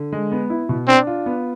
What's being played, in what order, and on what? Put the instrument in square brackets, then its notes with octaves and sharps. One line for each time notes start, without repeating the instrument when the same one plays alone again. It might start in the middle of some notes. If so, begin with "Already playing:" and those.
Already playing: [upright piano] D3
G#3
B3
E4
B2
[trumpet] C4 [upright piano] D4
[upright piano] F4
B3